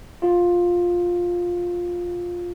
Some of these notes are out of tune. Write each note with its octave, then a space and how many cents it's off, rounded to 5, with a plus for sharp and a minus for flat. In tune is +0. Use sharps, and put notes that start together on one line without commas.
F4 +10